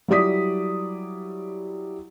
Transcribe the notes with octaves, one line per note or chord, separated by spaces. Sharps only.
F#3 G3 E4 D5 D#6 B6